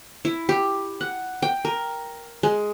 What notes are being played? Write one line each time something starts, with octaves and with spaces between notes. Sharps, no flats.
E4
G4
F#5
G5
A#4
G#3